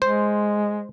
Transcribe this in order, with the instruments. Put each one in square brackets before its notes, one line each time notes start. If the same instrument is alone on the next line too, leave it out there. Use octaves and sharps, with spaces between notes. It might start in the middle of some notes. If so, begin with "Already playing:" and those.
[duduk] G#3 [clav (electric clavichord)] C5